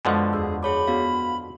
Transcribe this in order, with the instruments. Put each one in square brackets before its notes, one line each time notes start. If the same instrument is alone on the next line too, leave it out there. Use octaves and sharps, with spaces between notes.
[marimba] F#2 G#3 D#5 [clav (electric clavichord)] B2 D3 F3
[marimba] E2 E6 [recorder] G#4
[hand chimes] G#4 C#5 D6 [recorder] B5
[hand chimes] B3 F#4 F5